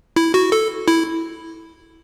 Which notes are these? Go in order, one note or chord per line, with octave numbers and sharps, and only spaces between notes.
E4
F#4
A4
E4